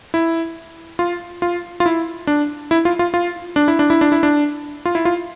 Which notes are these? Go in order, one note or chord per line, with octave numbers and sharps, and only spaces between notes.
E4
F4
F4
F4
E4
D4
E4
F4
F4
F4
D4
E4
D4
E4
D4
E4
D4
F4
E4
F4